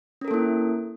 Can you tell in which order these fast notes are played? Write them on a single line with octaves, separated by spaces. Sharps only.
C#4 A#4 A4 A#3 E4